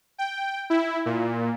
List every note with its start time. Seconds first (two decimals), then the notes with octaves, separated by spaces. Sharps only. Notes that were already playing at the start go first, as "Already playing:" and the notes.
0.18 G5
0.70 E4
1.06 A#2